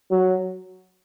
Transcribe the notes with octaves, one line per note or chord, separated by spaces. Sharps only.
F#3